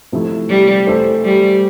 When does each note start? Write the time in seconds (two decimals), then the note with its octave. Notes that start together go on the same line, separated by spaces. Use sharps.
0.12 C3 F3 A3 E4
0.49 G3
0.87 E3 A3 E4 A4 C5
1.25 G3